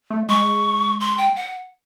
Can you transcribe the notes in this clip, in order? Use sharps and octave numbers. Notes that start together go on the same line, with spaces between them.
A3
G#3 C#6
C6
G5
F#5